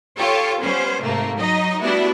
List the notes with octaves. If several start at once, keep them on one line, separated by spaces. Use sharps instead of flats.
F4 G4 A4 C#5
G3 B3 C#4 C5
G#2 C3 A3 A#3
F#3 D#4 D#5
G3 A3 B3 D4 E4 F#4